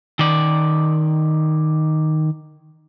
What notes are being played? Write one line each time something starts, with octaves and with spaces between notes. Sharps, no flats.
D#3 D5